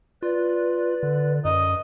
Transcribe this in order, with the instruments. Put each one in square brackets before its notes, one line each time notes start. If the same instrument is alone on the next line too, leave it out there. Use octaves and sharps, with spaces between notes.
[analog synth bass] F4 [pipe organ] B4 D5
[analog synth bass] D3
[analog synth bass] F#2 [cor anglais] D#5